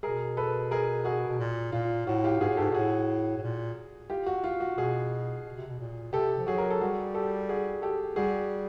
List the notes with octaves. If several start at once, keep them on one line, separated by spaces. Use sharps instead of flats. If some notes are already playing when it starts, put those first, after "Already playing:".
B2 G#4 A#4
A4 B4
G#4 A#4
F#4 G#4
B2
A#2
A#2 F4
A2 F#4
F4 G4
G#2 F#4 G#4
A2
G#2 G4 A4
A#2
A2 F#4 G#4
A2
A#2
F4 G4
F#4
F4
F#4
B2 F#4 G#4
B2
C3
B2
A#2
C3 G4 A4
F3
F#3 F#4 G#4
A#4
A4
G3 F#4 G#4
G4 A4
F#4 G#4
G4 A4
G3 F#4 G#4